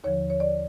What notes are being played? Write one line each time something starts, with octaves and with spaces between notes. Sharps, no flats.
D#2 D3 F3 C#5
C#5
D5